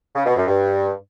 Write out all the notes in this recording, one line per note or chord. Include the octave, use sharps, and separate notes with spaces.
C#3
B2
F#2
G2